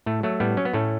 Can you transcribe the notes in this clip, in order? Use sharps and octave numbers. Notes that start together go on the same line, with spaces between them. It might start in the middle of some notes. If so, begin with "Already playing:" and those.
A2 A3
F#3 A3
A2 G3 B3
F#3 C#4
B3
A2 A3 C#4